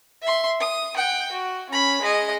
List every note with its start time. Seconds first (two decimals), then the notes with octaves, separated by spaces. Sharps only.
0.22 E5 C6
0.60 D#6
0.96 F#5 G5
1.32 F#4
1.70 C#4 B5
2.01 G#3 D#5